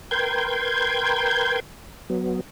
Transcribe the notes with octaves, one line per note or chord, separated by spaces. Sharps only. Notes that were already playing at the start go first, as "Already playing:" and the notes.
A#4 B4 G5 C6 G6 G#6
F#3 B3